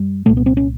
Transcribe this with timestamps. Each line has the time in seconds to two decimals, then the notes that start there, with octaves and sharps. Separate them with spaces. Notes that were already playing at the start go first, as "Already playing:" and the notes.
Already playing: F#2 G3
0.26 C2 A#2 A3
0.37 B3
0.46 C4
0.57 C#4